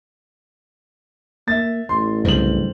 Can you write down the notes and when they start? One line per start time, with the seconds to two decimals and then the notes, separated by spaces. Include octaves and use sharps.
1.48 A#3 E5 A6
1.89 A1 C6
2.25 C2 G2 C#3 F#3 C4 F#7